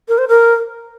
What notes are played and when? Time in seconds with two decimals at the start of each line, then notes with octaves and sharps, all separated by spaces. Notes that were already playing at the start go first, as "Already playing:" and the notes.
0.08 A#4
0.18 C5
0.28 A#4